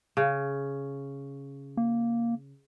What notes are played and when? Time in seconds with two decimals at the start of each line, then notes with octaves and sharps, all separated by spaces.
0.17 C#3
1.77 A#3